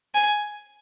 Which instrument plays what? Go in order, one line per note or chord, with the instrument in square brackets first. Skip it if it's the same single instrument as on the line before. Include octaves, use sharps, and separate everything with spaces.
[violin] G#5